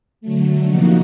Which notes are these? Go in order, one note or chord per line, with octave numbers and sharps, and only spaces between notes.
D3 F#3 A3
C3 F3 A#3 D#4 F#4